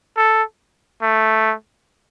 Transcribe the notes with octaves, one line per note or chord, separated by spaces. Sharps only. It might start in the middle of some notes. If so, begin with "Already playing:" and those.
A4
A3